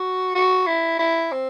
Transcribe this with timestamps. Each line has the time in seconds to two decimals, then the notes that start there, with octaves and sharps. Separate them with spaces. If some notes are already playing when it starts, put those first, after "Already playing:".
Already playing: F#4
0.35 F#4
0.66 E4
0.99 E4
1.31 C4